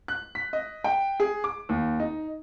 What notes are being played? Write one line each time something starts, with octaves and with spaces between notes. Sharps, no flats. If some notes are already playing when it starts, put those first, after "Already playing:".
F#6
B6
D#5
G5
G#4
D6
D#2
D#4